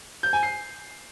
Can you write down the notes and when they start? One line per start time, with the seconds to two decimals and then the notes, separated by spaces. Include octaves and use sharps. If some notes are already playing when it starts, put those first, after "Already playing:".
0.23 G6
0.33 G#5
0.43 C7